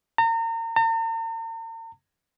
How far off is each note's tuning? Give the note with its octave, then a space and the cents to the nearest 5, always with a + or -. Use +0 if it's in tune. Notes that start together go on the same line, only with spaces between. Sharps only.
A#5 -35
A#5 -45